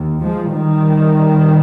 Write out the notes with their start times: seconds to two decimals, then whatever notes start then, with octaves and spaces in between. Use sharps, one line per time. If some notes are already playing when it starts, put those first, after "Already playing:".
Already playing: D#2
0.22 F3 G#3
0.53 D#3 G3